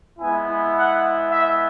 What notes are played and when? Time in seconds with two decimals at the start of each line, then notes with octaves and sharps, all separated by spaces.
0.19 G#3 B3 E4 G#5
0.75 F#5
1.31 E5